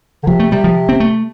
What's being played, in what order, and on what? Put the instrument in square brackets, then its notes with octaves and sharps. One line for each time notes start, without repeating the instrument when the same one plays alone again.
[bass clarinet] D3
[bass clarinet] C3 [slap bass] F3
[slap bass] A3
[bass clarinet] C3 [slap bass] G3
[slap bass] F3
C4
A3